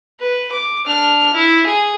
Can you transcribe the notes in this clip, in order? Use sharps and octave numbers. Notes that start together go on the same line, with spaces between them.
B4
D6
D4 F6
E4
G#4